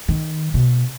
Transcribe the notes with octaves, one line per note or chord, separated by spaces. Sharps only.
D#3
B2